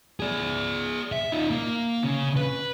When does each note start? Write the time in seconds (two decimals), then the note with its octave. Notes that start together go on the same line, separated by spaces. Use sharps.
0.20 G#4 D5
1.12 E5
1.32 D#4 F4
1.51 A#3
2.04 C#3
2.36 B4